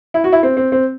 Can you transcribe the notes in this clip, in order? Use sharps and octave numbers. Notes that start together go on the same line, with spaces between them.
E4
F#4
E4
C4
C4
C4